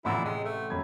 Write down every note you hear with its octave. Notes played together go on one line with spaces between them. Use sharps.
A1 F2 A#2 D3 E4 F#5
C3 G#3
A3
F#2 B5 G#6